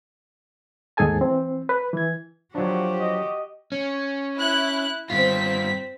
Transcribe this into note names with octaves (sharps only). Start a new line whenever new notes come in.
D#2 G#2 G#4 A4 G#5 A5
E3 C4
B4
E3 G#6
F3 F#3 D4 F#4 G4
D#5
C#4
E4 F#6
G2 C4 F4 B6